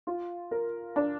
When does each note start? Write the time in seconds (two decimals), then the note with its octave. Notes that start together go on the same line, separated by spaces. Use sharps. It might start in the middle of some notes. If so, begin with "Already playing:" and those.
0.07 F4
0.51 A#4
0.96 D4